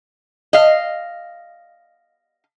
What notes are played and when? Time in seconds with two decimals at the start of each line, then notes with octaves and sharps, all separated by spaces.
0.53 D#5 F5